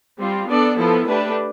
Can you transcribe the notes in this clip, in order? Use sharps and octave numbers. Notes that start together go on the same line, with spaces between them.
G3 C4 F4
B3 D4 A4 D5
F3 B3 E4 A4
A3 D4 G4 B4